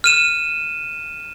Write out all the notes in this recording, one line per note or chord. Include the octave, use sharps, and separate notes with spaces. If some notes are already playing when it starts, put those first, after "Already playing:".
F6 D#7 E7